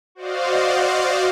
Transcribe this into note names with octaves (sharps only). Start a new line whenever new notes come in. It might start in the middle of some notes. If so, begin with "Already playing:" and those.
F#4 C5 D5 D#5 F5